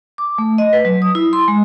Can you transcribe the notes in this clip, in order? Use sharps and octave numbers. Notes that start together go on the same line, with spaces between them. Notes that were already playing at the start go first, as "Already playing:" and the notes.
D6
A3
D#5
B4
F#3
D#6
E4
C6
G#3